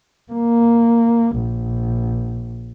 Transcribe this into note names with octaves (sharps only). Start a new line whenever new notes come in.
A#3
A#1